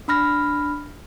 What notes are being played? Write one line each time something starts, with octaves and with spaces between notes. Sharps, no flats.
D4 B5 F6 A#6